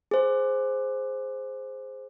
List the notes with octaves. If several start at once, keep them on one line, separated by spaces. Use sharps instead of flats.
G#4 C5